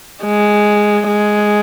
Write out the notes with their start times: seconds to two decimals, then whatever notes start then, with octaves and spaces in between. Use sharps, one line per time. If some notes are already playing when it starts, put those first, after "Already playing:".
0.23 G#3
1.08 G#3